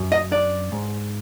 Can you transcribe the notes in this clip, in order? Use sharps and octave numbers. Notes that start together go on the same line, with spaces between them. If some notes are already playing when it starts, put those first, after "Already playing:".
Already playing: F#2
D#5
D4 D5
G#2